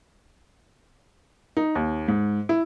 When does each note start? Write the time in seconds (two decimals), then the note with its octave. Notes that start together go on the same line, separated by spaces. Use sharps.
1.57 D#4
1.75 D#2
2.08 G#2
2.49 E4